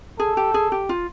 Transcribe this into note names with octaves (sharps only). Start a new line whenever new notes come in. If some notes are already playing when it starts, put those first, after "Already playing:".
G#4 A4
G4
G#4
G4
F4